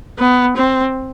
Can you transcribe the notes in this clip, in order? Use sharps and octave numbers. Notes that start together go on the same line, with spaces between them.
B3
C4